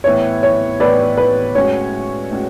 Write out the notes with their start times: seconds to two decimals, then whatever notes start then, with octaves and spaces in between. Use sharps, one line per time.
0.04 A2 E3 B3 E4 C#5
0.43 C#5
0.80 A2 E3 B3 E4 B4 D5
1.18 B4
1.55 A2 G#3 C#4 F#4 C#5
2.31 A2 G#3 C#4 F#4